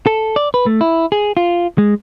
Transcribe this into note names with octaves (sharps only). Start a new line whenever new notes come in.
A4
D5
B4
A3
E4
G#4
F4
G#3